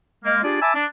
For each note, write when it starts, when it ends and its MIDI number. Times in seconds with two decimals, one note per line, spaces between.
0.24 0.40 56
0.24 0.40 58
0.43 0.60 62
0.43 0.60 65
0.43 0.60 67
0.43 0.60 68
0.43 0.60 74
0.62 0.72 76
0.62 0.72 80
0.62 0.72 81
0.62 0.72 83
0.62 0.72 86
0.62 0.72 88
0.74 0.85 62